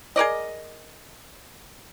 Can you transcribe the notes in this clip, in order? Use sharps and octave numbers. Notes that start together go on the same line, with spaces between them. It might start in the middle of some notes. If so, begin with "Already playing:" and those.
G#4 A#4 D5 D#5